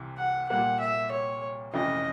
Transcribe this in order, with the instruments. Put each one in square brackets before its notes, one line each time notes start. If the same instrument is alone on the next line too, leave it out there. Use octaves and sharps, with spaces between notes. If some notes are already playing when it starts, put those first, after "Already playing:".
Already playing: [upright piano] C2 C3 E3
[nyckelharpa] F#5
[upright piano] A#2 G3 A#3 [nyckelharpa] F#5
[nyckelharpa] E5
C#5
[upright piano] F1 F2 C#3 E3 [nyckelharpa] D#5